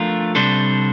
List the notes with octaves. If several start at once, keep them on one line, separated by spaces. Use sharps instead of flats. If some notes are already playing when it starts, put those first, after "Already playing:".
Already playing: F3 A3 D4 F4 A#4
C3 G3 D4 A4 C5